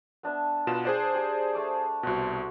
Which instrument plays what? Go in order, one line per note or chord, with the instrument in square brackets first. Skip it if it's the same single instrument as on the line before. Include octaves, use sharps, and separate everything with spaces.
[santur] B3 D4 E5
[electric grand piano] B2 F4 E7 [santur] B4 F#5 A#5
[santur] D4 [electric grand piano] G#4 C5 D5
[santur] G4 A#5
A3 D6
[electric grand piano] C2 B2 [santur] F#4 C5 F#5